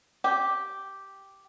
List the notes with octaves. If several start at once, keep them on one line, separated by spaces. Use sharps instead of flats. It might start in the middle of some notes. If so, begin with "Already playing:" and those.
G4